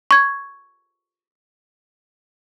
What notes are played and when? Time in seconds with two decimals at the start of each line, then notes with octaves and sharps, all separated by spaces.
0.11 C#6 G#6